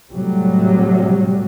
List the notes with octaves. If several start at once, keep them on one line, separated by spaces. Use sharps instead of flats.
A2 C3 F#3 G3